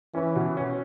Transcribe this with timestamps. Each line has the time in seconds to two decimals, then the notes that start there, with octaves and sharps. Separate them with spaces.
0.14 E3 C#4
0.35 B2
0.57 C#4